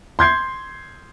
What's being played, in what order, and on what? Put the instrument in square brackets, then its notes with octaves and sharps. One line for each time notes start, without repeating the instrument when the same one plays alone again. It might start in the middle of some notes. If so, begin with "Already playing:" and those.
[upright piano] C6 G6 G#6 C7